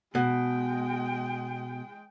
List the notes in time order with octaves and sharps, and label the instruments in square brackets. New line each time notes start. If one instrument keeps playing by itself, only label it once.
[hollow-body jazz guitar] B2 [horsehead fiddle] G#3 G5